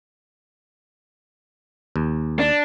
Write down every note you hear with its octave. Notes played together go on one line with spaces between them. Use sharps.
D#2
D4